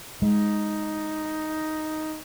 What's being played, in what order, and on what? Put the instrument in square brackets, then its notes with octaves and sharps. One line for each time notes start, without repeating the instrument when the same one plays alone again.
[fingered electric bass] G#3 [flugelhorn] D#4